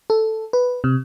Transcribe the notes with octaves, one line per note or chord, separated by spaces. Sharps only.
A4
B4
C3